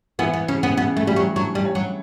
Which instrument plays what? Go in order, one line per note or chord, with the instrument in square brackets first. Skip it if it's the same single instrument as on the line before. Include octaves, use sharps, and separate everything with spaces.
[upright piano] E3 [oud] B3
[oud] B3
[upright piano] C#3 [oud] C#4
[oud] B3
[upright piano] C#3 [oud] B3
[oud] A3
[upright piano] E3 [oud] G3
[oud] F#3
[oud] F#3 [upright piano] D4
[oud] G3
[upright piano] C#5
[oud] F#3